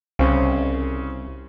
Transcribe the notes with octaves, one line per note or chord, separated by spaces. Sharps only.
C2 C#3 C4 C#4